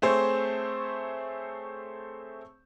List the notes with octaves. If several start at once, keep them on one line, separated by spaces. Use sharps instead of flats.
A3 C4 G#4 C5 C#5